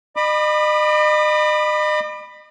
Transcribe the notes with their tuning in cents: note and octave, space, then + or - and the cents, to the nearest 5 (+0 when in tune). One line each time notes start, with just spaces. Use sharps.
D#5 -40 B5 +0 D6 +40